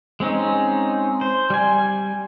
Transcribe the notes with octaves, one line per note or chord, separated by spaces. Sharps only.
G#3 C4 C#4 D#4
C5
G3 G#5